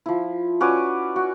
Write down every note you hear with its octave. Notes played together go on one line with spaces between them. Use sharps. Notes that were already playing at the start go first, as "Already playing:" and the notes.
F3 E4
C#4 F#4 B4 D5
F#4